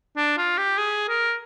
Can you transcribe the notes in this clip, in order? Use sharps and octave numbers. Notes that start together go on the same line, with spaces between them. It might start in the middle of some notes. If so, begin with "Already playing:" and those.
D4
F4
G4
G#4
A#4